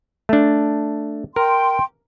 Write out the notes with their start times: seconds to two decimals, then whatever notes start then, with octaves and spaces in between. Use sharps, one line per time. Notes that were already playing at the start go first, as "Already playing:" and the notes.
0.29 A3 D4
1.36 A#4 G5 C6